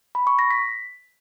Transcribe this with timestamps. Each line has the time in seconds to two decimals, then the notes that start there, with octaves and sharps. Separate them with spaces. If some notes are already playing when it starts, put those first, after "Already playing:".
0.15 B5
0.27 C#6
0.39 A#6
0.51 B6